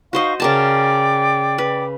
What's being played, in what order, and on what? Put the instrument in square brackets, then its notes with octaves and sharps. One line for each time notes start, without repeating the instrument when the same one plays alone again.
[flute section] D#4 F5 C#6 [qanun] F#4 C5 D#5
[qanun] C#3 A#4 A5 [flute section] D5 G5 D6
[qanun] B4